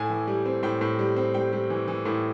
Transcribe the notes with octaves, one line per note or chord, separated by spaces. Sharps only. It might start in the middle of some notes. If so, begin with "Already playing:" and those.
Already playing: A2 G#5
E3
G3
C4
A2 G5
A2
G3
C4
G3 G5
G3
E3
E3
A2